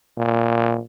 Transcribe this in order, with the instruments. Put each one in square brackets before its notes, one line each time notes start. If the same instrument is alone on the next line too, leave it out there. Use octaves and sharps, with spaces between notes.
[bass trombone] A#2